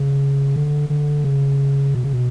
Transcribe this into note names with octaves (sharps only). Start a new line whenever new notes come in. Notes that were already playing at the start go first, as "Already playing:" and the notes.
Already playing: C#3
D3
D3
C#3
B2
C#3
B2